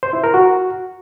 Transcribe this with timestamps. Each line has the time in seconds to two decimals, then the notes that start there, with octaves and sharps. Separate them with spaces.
0.03 C5
0.13 E4
0.24 A#4
0.34 F#4